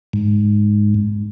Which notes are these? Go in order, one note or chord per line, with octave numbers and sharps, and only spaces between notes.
G#2